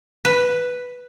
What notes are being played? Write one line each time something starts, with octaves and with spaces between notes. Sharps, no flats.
B4